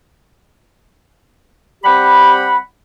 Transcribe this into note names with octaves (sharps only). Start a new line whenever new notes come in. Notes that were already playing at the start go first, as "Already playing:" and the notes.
G3 C4 G4 F#5 B5